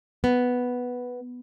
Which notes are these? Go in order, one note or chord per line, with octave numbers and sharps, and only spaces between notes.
B3